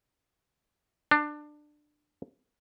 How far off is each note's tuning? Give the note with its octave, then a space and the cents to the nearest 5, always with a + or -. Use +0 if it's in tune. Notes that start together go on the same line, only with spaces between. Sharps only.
D4 +20